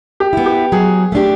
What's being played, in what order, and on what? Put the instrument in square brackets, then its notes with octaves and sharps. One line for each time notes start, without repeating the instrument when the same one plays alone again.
[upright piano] G4
[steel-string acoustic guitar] B3 E4
[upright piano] G4
[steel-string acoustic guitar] F#3 [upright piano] G#4
[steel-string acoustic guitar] A3 D4 G4